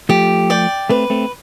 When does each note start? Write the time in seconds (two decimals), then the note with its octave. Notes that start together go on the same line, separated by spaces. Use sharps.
0.09 F3 A3 G4
0.50 D5 G5
0.89 A3 C4 B4
1.10 A3 C4